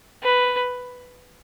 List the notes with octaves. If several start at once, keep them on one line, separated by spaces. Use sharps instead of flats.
B4